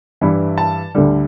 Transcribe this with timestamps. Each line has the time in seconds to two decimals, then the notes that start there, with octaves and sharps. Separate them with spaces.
0.21 G2 E3 G3 E4
0.58 A5
0.95 D2 D3 G3